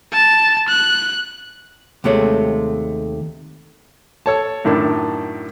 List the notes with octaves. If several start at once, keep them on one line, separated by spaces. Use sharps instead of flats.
A5
F#6
D#2 C3 G#3 A3 C#5
A4 C#5 A5
F#2 A2 D#3 D4